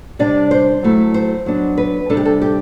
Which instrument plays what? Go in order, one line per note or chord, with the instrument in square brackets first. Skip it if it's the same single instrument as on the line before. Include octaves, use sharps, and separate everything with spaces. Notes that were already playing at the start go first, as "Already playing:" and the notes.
[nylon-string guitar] C3 G3 D4 D5
C5
F#3 A3 E4
C5
F#3 B3 D4
B4
C3 G3 D4 A4
G4
A4
G4